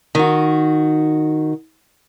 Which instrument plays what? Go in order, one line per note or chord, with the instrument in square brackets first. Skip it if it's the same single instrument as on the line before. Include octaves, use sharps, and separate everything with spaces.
[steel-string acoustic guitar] D#3 F#4